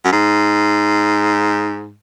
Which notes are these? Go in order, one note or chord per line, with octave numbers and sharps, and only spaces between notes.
F#2
G#2